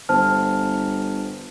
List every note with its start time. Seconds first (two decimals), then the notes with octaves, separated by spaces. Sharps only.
0.09 G1 C5 A5 F6